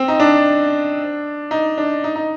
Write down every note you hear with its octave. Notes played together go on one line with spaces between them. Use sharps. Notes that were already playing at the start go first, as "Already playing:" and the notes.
Already playing: C4
D#4
D4
D#4
D4
D#4
D#4